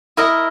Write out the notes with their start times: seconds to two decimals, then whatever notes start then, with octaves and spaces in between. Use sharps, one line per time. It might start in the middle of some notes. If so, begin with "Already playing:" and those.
0.17 E4 A#4 D#5